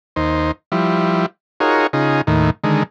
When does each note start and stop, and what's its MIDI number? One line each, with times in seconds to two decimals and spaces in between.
0.16 0.52 39
0.16 0.52 63
0.16 0.52 72
0.72 1.26 53
0.72 1.26 55
0.72 1.26 64
1.60 1.87 63
1.60 1.87 65
1.60 1.87 66
1.60 1.87 68
1.60 1.87 70
1.60 1.87 73
1.93 2.21 49
1.93 2.21 63
1.93 2.21 65
1.93 2.21 68
2.27 2.50 39
2.27 2.50 45
2.27 2.50 51
2.64 2.83 50
2.64 2.83 51
2.64 2.83 56